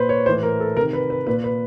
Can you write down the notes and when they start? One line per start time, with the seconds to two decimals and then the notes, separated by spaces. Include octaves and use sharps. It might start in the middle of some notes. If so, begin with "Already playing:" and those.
Already playing: A#2 B4 C5
0.09 C#5
0.26 A2 C5
0.29 E3
0.43 A#4
0.60 A4
0.77 C3 D#3 A#4
0.93 B4
1.10 B4
1.27 A#2 B4
1.44 B4